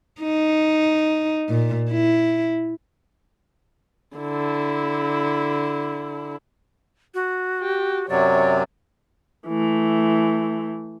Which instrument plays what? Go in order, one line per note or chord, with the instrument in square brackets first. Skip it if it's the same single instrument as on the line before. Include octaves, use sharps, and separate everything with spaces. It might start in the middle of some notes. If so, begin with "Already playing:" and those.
[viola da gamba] D#4
A#2
E4
[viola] D3 E4
[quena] F#4
[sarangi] G4
[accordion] F#2 C3 F#3 [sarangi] C#5 [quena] D5
[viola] E3 A3